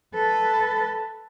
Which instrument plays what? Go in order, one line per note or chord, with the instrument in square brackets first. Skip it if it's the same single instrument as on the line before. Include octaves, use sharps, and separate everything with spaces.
[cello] A4 B4